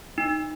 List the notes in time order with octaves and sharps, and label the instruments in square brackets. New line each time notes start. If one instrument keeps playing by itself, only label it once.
[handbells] D#4